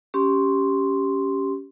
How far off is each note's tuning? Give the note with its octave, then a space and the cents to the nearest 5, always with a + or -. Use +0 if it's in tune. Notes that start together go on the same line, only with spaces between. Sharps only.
C#4 +10 G4 -10 C6 +0